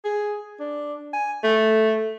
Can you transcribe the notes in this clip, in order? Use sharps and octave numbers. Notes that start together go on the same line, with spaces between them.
G#4
D4
G#5
A3